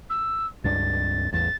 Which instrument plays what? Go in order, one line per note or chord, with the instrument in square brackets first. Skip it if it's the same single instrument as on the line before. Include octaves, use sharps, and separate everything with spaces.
[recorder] E6
[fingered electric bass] C#2 G2 D4 [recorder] A6
[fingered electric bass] A1 E2 [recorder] A6